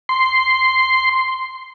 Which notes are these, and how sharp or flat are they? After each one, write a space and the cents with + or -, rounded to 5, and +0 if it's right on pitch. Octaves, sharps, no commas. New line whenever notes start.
C6 -5